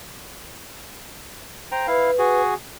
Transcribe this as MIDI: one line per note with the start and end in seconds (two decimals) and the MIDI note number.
1.72 1.86 72
1.72 1.86 79
1.72 1.86 82
1.87 2.11 64
1.87 2.41 71
1.87 2.11 77
2.18 2.54 66
2.18 2.54 68